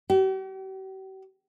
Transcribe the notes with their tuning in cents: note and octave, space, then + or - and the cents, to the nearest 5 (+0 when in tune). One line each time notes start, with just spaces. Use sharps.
G4 -45